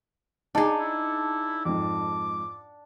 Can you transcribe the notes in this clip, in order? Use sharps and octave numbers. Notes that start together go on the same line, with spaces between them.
D4 D#4 G#4 F#5 A5 D6
E4
F2 G#2 D6